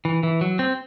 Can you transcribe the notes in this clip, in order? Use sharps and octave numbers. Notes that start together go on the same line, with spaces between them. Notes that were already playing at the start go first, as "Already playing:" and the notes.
E3
E3
F#3
C4